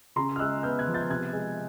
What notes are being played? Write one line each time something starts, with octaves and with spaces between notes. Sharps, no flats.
C#3 A#5 C6
F6
G#3 E6 F#6
B3 F6 G6
F#6 G#6
F3
G6 A6
C3 F#6 G#6
G#3